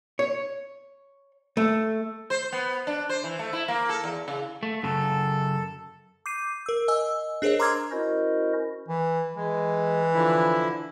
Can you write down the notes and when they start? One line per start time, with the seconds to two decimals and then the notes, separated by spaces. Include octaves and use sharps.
0.19 C#5
1.57 A3
2.30 C5
2.52 B3
2.87 D4
3.09 C5
3.24 E3
3.39 A3
3.53 E4
3.68 A#3
3.89 A4
4.04 E2
4.28 C#3
4.63 A3
4.83 F#2 C#3 A4
6.26 D6 G6 C7 D#7
6.66 A#4 E6
6.88 D#5 G#5 E6
7.42 D4 G#4 A#4 C5 C#5 D#5
7.60 A#5 C6 D6 E6 F6 G#6
7.91 C#4 E4 F#4 A#4 C5 D#5
8.88 E3
9.36 E3 G#3
10.14 D3 F3 E4